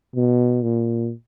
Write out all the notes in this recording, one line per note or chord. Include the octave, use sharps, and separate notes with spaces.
B2
A#2